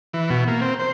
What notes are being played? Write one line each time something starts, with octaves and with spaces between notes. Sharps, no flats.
E3
B2
A#3
C4
C5